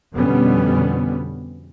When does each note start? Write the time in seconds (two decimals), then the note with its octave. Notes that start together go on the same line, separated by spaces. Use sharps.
0.13 F2 B2 D3 G3 B3 C#4